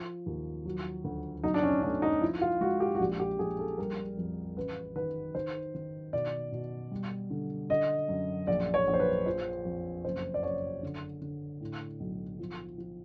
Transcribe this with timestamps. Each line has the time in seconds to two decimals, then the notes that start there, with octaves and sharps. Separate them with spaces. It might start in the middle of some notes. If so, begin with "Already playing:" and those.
Already playing: F3
0.26 D#2
0.65 F#3
1.04 D2
1.43 B1 D#4
1.54 D4
1.63 C#4
1.83 A3 D4
2.02 D#4
2.22 F3 E4
2.41 F4
2.61 G#3 F#4
2.80 G4
2.95 F#4
3.00 A#1 G4
3.20 G4
3.39 A#1 G#4
3.59 A4
3.78 G3 A#4
4.17 F2
4.57 A1 B4
4.96 D#3 B4
5.35 D#3 C5
5.74 D#3
6.13 B2 D5
6.52 B2
6.91 G3
7.30 D3
7.69 D3 D#5
8.09 F#2
8.47 A#1 D5
8.74 C#5
8.87 A#1
8.94 C5
9.00 B4
9.26 F3 C5
9.65 F2
10.04 F#1 C5
10.34 D5
10.43 F#1 C#5
10.83 D3
11.22 D3
11.60 A2
12.00 B1
12.39 F3
12.78 F3